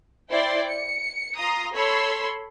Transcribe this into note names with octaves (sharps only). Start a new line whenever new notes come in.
E4 C5 D5 G5 C6
C#7
F4 A#5 C6 D#6
A4 C#5 B5 C6 E6